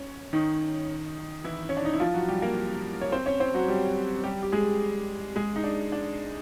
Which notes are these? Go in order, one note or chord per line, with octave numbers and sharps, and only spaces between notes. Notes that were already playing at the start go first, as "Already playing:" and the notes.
Already playing: C#4
D#3 D#4
E3 E4
C#4
D4
D#4
E4
F3 F4
F#3 F#4
G3 G4
A#3 A#4
C#5
C4 C5
C#4 C#5
C4 C5
F#3 F#4
G3 G4
G3 G4
G4
G#3 G#4
G#3 G#4
D#4
D4
D4